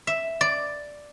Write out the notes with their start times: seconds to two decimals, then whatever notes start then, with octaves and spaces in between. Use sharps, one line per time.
0.07 E5
0.41 D5